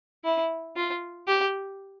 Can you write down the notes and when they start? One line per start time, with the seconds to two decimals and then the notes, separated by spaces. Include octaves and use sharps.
0.24 E4
0.76 F4
1.27 G4